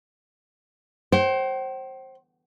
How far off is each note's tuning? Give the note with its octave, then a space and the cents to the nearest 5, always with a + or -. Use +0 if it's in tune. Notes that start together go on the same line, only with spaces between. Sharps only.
C5 +25 G5 -40